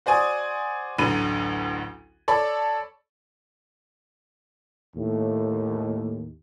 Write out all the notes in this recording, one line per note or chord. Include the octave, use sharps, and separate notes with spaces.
F#4 C5 D5 G#5 C#6 D#6
A1 D2 D3 F#3 B5 D#7
A4 C#5 D5 B5
D#2 A2